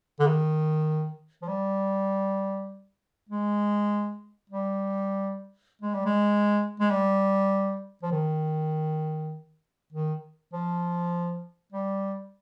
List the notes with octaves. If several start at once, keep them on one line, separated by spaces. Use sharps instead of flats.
D3
D#3
F3
G3
G#3
G3
G#3
G3
G#3
G#3
G3
F3
D#3
D#3
F3
G3